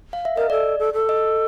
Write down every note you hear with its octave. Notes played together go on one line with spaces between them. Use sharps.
F5
E5
A#4 D#5
A4 D5
A4
A4
D#5